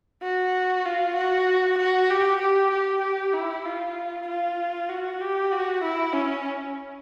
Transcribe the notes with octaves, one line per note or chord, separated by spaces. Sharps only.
F#4
F4
F#4
F#4
G4
G4
G4
G4
E4
F4
F4
F#4
G4
F#4
E4
C#4